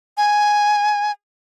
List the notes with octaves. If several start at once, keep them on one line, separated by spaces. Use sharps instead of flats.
G#5